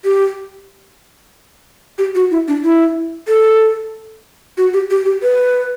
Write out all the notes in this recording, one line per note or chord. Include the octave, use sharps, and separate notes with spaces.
G4
G4
F#4
E4
D4
E4
A4
F#4
G4
G4
G4
B4